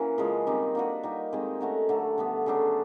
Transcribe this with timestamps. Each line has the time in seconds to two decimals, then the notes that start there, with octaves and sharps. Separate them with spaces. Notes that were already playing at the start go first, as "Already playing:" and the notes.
Already playing: E3 A#3 C#4 F#4 A#4
0.18 C#3 F3 G#3
0.47 D#3 G3 C4 D#4
0.75 A#3 D4 F#4 B4
1.03 G3 A#3 D#4
1.32 D#3 G#3 C4
1.60 A3 C#4 F#4 A#4
1.89 D3 F#3 A3
2.18 D3 G3 B3
2.46 C#3 F#3 A3 D4